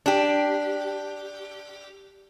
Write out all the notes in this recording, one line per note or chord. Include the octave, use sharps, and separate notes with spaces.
D4 G4